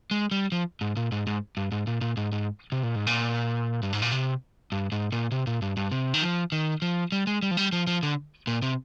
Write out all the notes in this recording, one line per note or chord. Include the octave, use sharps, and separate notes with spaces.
G#3
G3
F3
G#2
A#2
G#2
G#2
G2
G#2
A#2
A#2
G#2
G#2
C3
A#2
G#2
A#2
G2
G#2
A#2
C3
G2
G#2
A#2
C3
A#2
G2
G2
C3
D#3
F3
D#3
F3
G3
G#3
G3
F3
G3
F3
F3
D3
A#2
C3